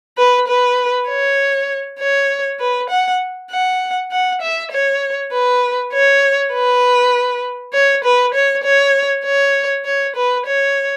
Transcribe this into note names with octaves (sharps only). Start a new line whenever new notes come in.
B4
B4
C#5
C#5
B4
F#5
F#5
F#5
E5
C#5
B4
C#5
B4
C#5
B4
C#5
C#5
C#5
C#5
B4
C#5